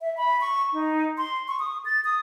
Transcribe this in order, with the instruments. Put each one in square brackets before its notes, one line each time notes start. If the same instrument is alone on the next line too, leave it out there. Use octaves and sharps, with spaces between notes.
[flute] E5
B5
C#6
D#4
C6
C#6
D#6
A6
D#6